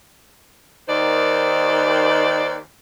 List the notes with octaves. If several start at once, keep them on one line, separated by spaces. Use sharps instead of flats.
D#2 D#3 C5 D5